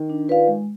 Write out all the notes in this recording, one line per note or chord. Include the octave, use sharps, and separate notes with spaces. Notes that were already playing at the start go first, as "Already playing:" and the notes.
Already playing: D#3
D4
F4 B4 D5 F5
G#3